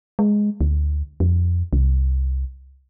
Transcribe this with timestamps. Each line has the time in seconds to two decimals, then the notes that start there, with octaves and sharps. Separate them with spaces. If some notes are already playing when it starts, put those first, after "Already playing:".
0.19 G#3
0.61 D2
1.20 F2
1.73 C2